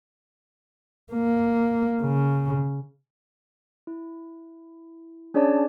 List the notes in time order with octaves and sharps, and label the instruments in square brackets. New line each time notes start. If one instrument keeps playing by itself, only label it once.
[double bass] A#3
C#3
[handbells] E4
C#4 D4 G#4 C#5 D5 A5